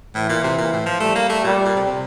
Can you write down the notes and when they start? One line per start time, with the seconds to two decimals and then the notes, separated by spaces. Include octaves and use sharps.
0.15 A2 E3
0.29 A#2
0.44 C3
0.58 A#2
0.73 A2
0.86 F3
1.00 G3 A3
1.16 A#3
1.29 A3
1.44 A#2 G3
1.65 A#2
1.76 C3
1.86 C3